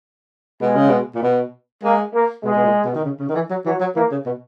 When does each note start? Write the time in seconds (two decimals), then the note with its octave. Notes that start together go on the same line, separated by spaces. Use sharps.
0.62 B2 G#3
0.75 C#3
0.89 B2
1.15 A#2
1.23 B2
1.84 G#3 A#3
2.14 A#3
2.44 B2 G#3
2.56 B2
2.65 A#2
2.85 B2
2.95 D#3
3.05 C#3
3.20 C#3
3.29 D#3
3.35 E3
3.50 F#3
3.66 E3 F#3
3.81 F#3
3.96 E3 A#3
4.11 C#3
4.26 B2